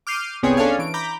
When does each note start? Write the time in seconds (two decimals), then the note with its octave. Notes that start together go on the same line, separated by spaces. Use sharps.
0.07 D6 F6 G6 C7 D#7
0.43 G1 C2 B3 C4 G#4 C#5
0.57 C#4 D4 A4 C#5 F5 G#5
0.79 E3 D7
0.94 A#5 B5 D6 G6